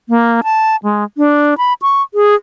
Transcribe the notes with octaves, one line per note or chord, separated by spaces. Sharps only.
A#3
A5
G#3
D4
B5
C#6
G#4